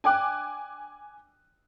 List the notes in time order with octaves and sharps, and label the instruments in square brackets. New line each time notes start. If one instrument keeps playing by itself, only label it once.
[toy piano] D4 D5 G5 [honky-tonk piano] G#5 D6 F#6